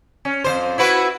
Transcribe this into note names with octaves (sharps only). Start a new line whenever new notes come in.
C#4
F2 D3 C5
E4 F#4 B4